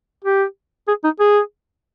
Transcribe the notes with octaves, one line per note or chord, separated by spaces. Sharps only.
G4
G#4
D#4
G#4